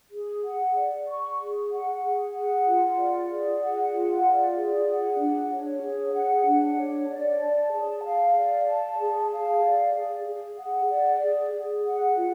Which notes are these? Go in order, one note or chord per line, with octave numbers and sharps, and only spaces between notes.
G#4
F#5
D5
C#6
G#4
F#5
G#4
F#5
F4
D5
G#4
F#5
F4
D5
G#4
F#5
D4
C#5
G#4
F#5
D4
C#5
D5
A5
G#4
F5
D5
A5
G#4
F5
D5
G#4
G#4
F#5
D5
G#4
G#4
F#5
F4